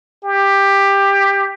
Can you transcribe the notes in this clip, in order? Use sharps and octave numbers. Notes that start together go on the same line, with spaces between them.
G4